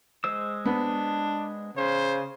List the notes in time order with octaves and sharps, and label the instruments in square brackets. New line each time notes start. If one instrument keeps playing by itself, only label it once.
[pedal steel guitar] G#3 C5 E6
[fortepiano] B3 [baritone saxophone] D4
[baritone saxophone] C#3 [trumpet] C5